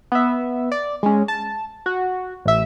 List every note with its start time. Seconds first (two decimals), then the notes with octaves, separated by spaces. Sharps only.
0.12 B3 E5
0.72 D5
1.03 G#3 C#4
1.28 A5
1.86 F#4
2.46 A1 E5